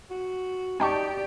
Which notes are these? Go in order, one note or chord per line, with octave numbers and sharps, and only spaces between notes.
F#4
D#4 G4 D5 G5 A5 C#6